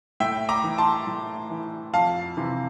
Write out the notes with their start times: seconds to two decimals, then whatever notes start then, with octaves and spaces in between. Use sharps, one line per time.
0.20 A2 E5 G5
0.49 A#5 D6
0.64 E3
0.78 A5 C6
1.07 A2
1.50 E3
1.94 F2 F5 A5
2.37 C3 E3